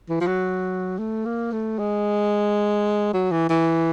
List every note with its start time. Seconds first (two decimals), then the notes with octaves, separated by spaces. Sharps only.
0.09 E3
0.21 F3
0.27 F#3
0.98 A3
1.25 A#3
1.52 A3
1.79 G#3
3.14 F#3
3.31 E3
3.50 E3